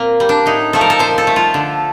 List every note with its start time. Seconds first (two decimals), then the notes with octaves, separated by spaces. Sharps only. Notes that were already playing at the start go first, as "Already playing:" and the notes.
Already playing: A#2 A#3 C4
0.20 G3
0.29 D4
0.46 A2 D#4
0.73 F3 A3 A4
0.81 A#4
0.90 A4
0.99 A#2 C5
1.18 A4
1.27 A3
1.36 F4
1.54 D3